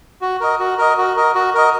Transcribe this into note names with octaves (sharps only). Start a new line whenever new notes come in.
F#4
A#4 D#5
F#4
A#4 D#5
F#4
A#4 D#5
F#4
A#4 D#5